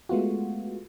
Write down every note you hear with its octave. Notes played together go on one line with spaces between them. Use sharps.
G#3 A3 B3 F4 F#4